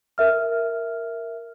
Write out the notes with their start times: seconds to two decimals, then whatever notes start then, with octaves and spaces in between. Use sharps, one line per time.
0.18 A#4 E5 F6